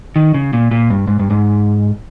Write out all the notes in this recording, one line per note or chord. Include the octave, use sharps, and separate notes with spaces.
D#3
C#3
A#2
A#2
G2
G#2
G2
G#2